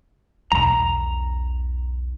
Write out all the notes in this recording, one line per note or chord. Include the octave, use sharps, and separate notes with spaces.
B1 E2 A#5